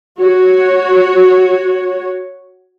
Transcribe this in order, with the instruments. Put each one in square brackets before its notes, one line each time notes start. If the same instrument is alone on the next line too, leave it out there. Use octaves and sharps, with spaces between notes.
[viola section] F#4 C#5